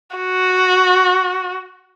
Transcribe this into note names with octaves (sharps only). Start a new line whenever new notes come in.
F#4